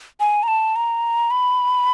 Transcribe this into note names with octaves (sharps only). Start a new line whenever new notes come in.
G#5
A#5
A5
A#5
B5